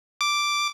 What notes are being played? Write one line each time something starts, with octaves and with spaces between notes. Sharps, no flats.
D6